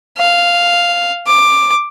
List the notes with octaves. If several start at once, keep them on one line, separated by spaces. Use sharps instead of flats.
F5
D6